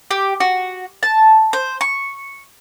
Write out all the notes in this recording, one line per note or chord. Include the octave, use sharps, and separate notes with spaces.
G4
F#4
A5
C5
C#6